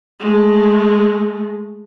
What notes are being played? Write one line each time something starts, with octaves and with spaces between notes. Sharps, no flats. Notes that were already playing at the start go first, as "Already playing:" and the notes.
G#3 A3